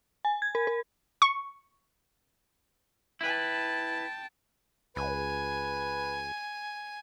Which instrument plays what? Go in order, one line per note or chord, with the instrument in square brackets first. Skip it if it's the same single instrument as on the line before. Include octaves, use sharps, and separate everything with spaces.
[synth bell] G#5
G#6
A#4
A#4
[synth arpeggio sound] C#6
[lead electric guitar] E4 B4 [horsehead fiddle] G5 A5
[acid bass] C#2 [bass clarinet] B4 [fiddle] G#5